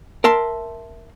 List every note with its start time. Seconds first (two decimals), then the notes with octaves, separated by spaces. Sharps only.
0.24 A#4 E5 A5 C6